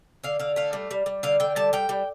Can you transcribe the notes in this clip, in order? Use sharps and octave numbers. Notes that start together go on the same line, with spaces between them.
D3 F5
D3 F5
A3 F5
G3
G3
G3
D3 F5
D3 G5
G3 A5
G3 G5
G3